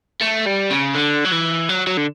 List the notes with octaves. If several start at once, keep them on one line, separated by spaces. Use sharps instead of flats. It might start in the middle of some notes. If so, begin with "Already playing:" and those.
A3
G3
C#3
D3
F#3
E3
F#3
F#3
D3